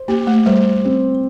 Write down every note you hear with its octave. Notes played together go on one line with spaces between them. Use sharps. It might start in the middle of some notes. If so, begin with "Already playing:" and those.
Already playing: C5
A#3 G4
A3
G3 C5
C4